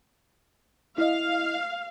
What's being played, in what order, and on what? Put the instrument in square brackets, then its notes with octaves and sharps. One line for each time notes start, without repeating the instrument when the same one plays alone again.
[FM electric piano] E4 D#5 [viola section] F5